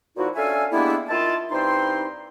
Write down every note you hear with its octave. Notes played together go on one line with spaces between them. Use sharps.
A#2 F3 D#4 E4 F#4
C#4 D4 A4 E5 F5 G#5
G3 G#3 A#3 B3 D4 E4
D#3 E4 F4 A5
G2 C4 D#4 E4 G5 C6